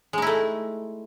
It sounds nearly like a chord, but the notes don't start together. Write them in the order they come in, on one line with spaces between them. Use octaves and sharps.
G#3 D#4 E4 A3